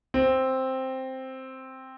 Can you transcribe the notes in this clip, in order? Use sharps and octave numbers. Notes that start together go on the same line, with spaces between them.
C4